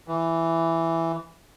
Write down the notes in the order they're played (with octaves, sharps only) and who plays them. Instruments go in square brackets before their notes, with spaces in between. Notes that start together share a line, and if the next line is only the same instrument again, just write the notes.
[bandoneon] E3